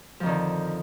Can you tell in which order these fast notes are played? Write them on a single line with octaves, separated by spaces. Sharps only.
F3 F2 D#3 D3